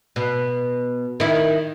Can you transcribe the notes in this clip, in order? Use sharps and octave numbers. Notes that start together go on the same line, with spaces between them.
B2
D#3 E4